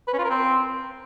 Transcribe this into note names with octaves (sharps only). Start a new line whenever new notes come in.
B4
C#4
F4
A#4
C4